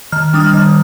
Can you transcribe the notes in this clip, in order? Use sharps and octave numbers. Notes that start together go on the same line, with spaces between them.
D#3 F6
G3 D4 D#6
F6
D#3 F6